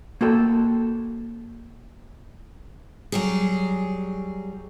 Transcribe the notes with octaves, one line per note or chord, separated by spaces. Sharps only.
A#3 F#4 A4 G5
F#3 G3 G#4